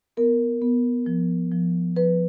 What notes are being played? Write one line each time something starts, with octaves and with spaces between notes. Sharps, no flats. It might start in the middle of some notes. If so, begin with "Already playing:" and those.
B3 A#4
B3
F3
F3
F3 B4